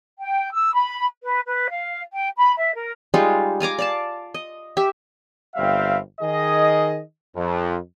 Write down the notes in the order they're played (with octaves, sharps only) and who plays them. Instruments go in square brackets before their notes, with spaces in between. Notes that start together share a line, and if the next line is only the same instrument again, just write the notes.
[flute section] G5
E6
B5
B4
B4
F5
G5
B5
E5
A#4
[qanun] G3 G#3 D#4 F4
F4 G#5 A#5 D6
D5 F5 A5
D#5
G4 E5
[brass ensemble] G1 G3 C4 E5 F5
D#3 G#4 D#5
F2